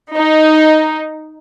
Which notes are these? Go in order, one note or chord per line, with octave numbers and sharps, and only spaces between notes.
D#4